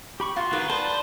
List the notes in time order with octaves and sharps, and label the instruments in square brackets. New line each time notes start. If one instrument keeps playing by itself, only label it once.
[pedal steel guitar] G4 B5 C#6
[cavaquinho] F4 [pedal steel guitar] F#4 C6
[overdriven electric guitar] D#3 [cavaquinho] B4
[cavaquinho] B4 [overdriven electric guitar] C5 [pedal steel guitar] D5 A5